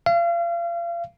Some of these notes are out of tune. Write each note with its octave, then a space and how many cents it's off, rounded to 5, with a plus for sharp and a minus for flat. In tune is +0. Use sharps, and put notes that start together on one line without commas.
F5 -35